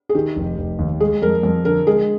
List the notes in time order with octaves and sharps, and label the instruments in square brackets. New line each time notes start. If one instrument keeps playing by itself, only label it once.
[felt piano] G#4
[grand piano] D#3 [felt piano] G4
[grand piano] F1
F1
D#2
[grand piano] G#3 [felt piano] G#4
[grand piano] F2 [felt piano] A#4
[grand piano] F2
[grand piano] D3 [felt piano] A#4
[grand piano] G#3 [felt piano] G#4